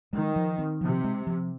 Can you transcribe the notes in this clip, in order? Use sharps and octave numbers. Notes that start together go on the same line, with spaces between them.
D#3 G#3
F3
C4
C3 F3
G#3
F3